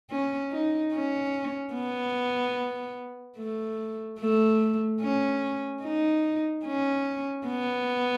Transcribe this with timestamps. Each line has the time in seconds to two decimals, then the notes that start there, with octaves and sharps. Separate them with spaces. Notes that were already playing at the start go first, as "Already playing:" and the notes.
0.11 C#4
0.52 D#4
0.93 C#4
1.74 B3
3.38 A3
4.20 A3
5.02 C#4
5.83 D#4
6.65 C#4
7.47 B3